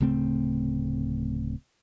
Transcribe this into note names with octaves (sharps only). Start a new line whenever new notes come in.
D1 C#3 A3 C4